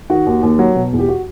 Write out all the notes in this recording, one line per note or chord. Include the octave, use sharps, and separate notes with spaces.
D#3 F#4
D#2
D#2
F#3
B2
E2
G4
F#4